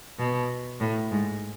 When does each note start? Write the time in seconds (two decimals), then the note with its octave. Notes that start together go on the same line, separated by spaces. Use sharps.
0.18 B2
0.80 A2
1.11 G#2